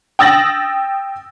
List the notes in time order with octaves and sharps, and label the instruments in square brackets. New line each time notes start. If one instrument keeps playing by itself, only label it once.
[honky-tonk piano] G5 D#6 E6 A6 A#6 F#7